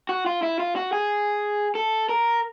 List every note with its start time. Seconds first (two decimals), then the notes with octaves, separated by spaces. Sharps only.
0.09 F#4
0.26 F4
0.43 E4
0.59 F4
0.76 F#4
0.93 G#4
1.75 A4
2.09 A#4